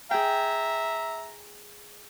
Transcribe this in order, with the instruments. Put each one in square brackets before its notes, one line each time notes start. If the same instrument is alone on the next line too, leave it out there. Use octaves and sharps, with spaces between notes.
[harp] G#4 G5 [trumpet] E5 [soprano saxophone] A#5